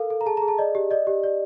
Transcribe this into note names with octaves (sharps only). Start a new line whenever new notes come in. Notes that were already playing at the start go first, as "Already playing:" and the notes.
Already playing: A4 A#4 F5
A4
A#5
G#4 A5
A#5
G#4
A5
D5 D#5
G4
D5 D#5
G4
D5